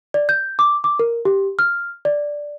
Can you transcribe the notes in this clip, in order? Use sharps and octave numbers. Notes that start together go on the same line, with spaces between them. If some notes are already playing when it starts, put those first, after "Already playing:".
D5
G6
D6
D6
A#4
G4
F6
D5